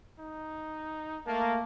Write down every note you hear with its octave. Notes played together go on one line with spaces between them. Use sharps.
D#4
A3 A#3 A5